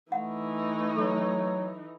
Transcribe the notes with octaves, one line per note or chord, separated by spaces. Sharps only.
E3 A3 D#4 F#5
F#3 A4